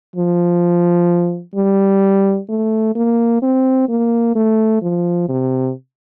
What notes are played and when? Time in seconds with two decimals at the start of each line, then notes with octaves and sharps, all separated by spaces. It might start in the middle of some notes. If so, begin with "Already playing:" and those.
0.16 F3
1.56 G3
2.49 A3
2.96 A#3
3.42 C4
3.89 A#3
4.36 A3
4.82 F3
5.29 C3